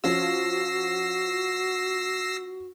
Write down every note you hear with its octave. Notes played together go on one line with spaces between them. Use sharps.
F3 C#4 F4 F#4 E6 A#6 C7